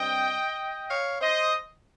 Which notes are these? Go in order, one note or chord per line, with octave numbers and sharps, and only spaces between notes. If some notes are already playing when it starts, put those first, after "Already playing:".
Already playing: G2 G3 C4 D#5 G5
C#5 F5
C5 D#5